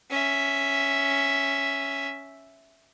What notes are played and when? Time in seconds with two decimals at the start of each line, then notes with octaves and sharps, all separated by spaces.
0.11 C#4 E5